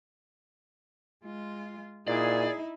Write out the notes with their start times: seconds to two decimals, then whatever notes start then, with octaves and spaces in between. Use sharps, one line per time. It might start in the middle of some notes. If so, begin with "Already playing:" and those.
1.25 G#3 F4
2.08 A#2 D#4 E4 G#4 D5